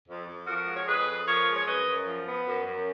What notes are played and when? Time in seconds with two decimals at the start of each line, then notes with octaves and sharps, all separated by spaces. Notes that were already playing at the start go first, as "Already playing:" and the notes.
0.07 F2
0.27 F2
0.47 F3 F#4 A#4
0.66 G#3
0.75 C#5
0.86 F2 G#4 B4
1.06 F2
1.26 F3 A#4 C#5
1.46 G#3
1.55 C#5
1.66 F#2 B4 D#5
1.86 F#2
2.06 F3
2.25 B3
2.46 F#2
2.65 F#2